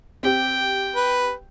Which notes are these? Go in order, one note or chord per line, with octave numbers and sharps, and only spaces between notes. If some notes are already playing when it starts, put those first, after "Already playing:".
C4 G4 G5
B4